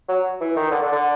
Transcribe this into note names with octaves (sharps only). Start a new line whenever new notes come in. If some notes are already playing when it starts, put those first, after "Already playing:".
F#3
E3
D#3
D3
D3
D3